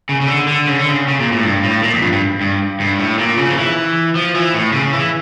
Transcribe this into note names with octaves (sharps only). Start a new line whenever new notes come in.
C#3
C#3
D3
D3
C#3
D3
C#3
C#3
A#2
A2
G2
A2
A#2
F2
G2
G2
G2
G2
A2
A#2
C#3
F3
E3
F3
E3
A2
C#3
E3